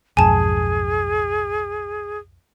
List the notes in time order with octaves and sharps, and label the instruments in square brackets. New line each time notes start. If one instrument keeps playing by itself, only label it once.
[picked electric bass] B1 F2 G#2 [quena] G#4 [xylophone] G#5 A5